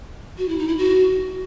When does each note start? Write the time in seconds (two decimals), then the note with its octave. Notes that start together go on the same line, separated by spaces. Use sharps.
0.38 F#4
0.49 E4
0.58 D#4
0.68 E4
0.78 F#4